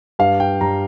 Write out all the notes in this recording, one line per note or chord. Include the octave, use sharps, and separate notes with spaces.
G2 F5
G5
G2 A#5